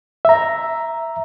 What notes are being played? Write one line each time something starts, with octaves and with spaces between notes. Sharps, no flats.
E5 A#5